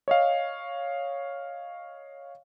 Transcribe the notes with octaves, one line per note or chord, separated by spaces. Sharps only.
C#5 D#5 F5